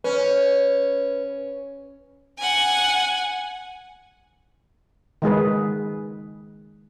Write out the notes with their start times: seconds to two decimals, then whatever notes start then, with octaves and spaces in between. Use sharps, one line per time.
0.04 C#4 B4
2.39 F#5 G#5
5.22 D#3 G#3 G#4 B4